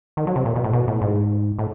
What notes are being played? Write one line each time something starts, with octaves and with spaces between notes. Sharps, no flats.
D#3
F#3
C3
A#2
B2
A2
B2
A2
G#2
A2